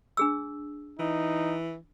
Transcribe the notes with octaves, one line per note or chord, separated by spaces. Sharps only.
D4 G#4 E6
E3 D#4